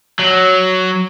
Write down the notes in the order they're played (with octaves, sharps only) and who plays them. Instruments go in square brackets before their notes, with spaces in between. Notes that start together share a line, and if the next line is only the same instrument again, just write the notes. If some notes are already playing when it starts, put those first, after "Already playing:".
[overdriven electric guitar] F#3